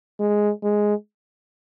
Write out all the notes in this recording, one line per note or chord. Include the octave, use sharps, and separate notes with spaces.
G#3
G#3